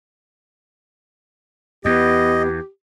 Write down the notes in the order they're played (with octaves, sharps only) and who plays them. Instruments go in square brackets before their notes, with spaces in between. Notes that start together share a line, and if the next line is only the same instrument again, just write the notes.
[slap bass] E2 [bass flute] B3 [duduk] G4 [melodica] D#5